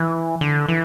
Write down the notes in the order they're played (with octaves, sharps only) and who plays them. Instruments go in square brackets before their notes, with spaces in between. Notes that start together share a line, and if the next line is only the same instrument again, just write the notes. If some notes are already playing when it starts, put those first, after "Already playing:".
Already playing: [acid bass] E3
D3
E3